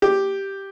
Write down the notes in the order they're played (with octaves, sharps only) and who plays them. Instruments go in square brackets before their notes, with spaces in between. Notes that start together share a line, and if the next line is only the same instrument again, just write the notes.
[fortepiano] G4